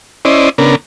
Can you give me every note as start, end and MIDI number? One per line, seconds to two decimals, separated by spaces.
0.25 0.49 61
0.25 0.49 64
0.25 0.49 72
0.25 0.49 74
0.25 0.49 75
0.58 0.75 49
0.58 0.75 59
0.58 0.75 62
0.58 0.75 70